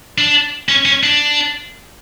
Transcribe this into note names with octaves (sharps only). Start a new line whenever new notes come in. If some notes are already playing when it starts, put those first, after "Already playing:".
D4
C#4
C#4
D4